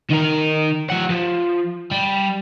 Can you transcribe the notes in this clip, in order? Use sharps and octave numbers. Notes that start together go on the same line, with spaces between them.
D#3 A#4
F3 F#5
F3
G3